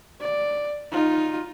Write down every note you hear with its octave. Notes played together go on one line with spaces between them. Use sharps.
D5
D#4 F4